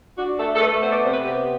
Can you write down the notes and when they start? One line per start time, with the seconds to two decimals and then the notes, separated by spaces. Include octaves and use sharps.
0.16 D4 F#4
0.38 A3 A4
0.55 A4
0.59 A3 B4
0.80 B3 C5
0.91 D5
1.02 C3 C5
1.13 B4
1.24 B3 G4